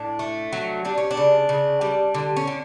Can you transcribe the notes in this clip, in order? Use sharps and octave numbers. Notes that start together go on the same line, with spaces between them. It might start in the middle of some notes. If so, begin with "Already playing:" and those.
Already playing: A2 D4
A3
F#3
G3 D4
C#4
D4
C#3
C#3
G3
D3
C#4
D3